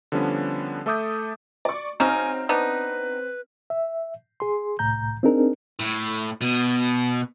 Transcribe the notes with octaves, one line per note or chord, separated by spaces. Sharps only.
D3 F3 G3 B3 C#4 D4
A3 A4 E5 D6 D#6 G6
D5 C#6
C#3 F#3 C4 D#4 G#5 F6
B3 D4 D#4 B4
E5
G#4 C6
C2 A2 A#5 G6
C4 D4 D#4 G#4 A#4
A2
B2